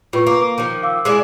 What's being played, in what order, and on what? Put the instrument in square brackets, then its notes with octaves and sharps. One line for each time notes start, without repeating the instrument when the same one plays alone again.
[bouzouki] A2 [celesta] F4 B4 C#6
[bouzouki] A#3
[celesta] D6
[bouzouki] D#3 F3
[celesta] F5 D6 E6
[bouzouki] G#3 E4 D5